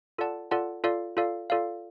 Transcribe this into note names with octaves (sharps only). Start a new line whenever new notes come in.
F4 A4 D5 F#5 A5
F4 A4 D5 F#5 A5
F4 A4 D5 F5
F4 A4 D5 F5
F4 A4 D5 F5